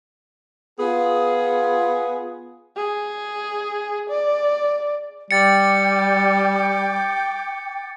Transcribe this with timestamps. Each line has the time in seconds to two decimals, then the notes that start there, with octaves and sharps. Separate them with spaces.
0.80 B3 F4 G#4
2.76 G#4
4.10 D5
5.31 G3 G5 D6 A6 C#7